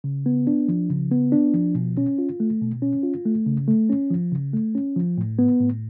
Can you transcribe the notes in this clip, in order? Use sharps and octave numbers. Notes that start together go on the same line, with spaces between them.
C#3
B3
D4
F3
C#3
B3
D4
F3
B2
C#4
F4
A3
B2
C#4
F4
A3
C#3
A3
C#4
F3
C#3
A3
C#4
F3
A2
B3
A2